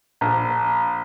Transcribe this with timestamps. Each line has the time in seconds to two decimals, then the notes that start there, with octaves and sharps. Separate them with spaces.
0.21 A#1